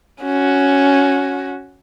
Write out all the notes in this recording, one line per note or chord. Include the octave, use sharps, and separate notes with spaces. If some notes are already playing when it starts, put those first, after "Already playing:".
C#4 F#4